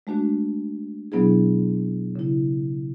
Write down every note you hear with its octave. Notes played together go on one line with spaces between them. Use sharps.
G#3 A3 D4 F#4
B2 F#3 B3 D4 E4 G#4
C#3 E4